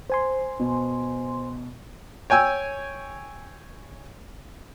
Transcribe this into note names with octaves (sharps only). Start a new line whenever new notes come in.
C5 G#5 C6
B2
C#5 G5 G#5 E6